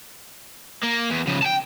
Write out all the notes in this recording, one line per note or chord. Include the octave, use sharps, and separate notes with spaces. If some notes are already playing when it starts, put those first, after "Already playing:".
A#3
E2
C#3 F3
G5 A5